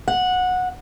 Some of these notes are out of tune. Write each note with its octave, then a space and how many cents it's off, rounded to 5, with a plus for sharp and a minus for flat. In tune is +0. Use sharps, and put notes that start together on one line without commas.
F#5 -15